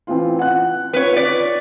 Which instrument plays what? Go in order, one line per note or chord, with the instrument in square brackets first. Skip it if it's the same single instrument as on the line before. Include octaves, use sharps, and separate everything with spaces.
[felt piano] E3 C4 F4
F#5 F#6
[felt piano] C4 F4 [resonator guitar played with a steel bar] B4 C#5
[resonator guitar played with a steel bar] D5 [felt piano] B6